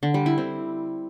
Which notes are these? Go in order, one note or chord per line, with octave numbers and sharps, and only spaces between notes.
D3
G3
E4
C4